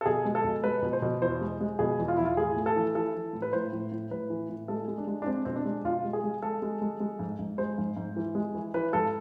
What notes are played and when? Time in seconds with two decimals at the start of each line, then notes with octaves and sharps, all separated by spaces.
0.01 A4
0.06 B2 G#4
0.25 G#3
0.35 A4
0.44 B2
0.63 G#3 B4
0.82 B2
0.93 C5
1.02 B2
1.22 E2 C5
1.41 G#3
1.61 G#3
1.79 B2 G#4
1.99 E2
2.08 F4
2.17 E2 E4
2.25 F4
2.37 A2 G#4
2.56 A3
2.66 A4
2.76 E3
2.95 E3 A4
3.15 E3
3.33 A2
3.42 B4
3.53 A2 C5
3.73 A2
3.92 A2
4.11 A2 B4
4.30 E3
4.49 A2
4.68 G#3 A4
4.88 G#3
4.98 D4
5.07 G#3
5.22 D4
5.26 G#3 C4
5.45 B2 C4
5.56 D4
5.65 G#3
5.85 B2 F4
6.04 G#3
6.13 G#4
6.24 G#3
6.42 G#3 A4
6.62 G#3
6.82 G#3
7.00 G#3
7.19 G#2
7.39 G#2
7.58 G#3 C5
7.78 G#2
7.96 G#2
8.16 E3
8.35 G#3
8.55 E3
8.74 E3 B4
8.93 G#2 A4